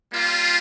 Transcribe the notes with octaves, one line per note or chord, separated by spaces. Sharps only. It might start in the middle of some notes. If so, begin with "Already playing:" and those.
G3 A#3 F4